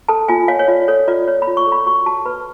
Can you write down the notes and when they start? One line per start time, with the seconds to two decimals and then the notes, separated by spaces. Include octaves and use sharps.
0.08 A4 A5
0.28 F4 G#5
0.48 C#5 F5
0.59 C#5
0.68 F4 D5
0.88 A4 C#5
1.08 F4 D5
1.28 C#5
1.42 B5
1.47 F4
1.57 C#6
1.67 A4
1.72 B5
1.86 F#4 C#6
2.06 F#4 A5
2.25 B4 B5